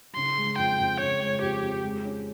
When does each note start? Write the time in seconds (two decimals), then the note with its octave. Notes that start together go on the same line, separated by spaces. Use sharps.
0.16 C#3 C6
0.37 G#3
0.58 F2 G5
0.79 F2
1.00 C#3 C#5
1.21 G#3
1.42 F2 G4
1.62 F2
1.83 G#3
2.05 C#4